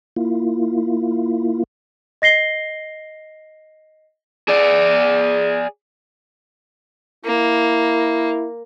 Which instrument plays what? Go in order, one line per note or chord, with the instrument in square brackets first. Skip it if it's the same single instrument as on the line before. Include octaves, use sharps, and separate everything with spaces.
[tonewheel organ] A#3 E4 F4
[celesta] D#5 A#6 C7 G7
[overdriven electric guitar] G#4 D5
[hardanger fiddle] A#3 [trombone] E4